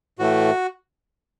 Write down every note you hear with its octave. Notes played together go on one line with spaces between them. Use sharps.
A2 E3 A3 F#4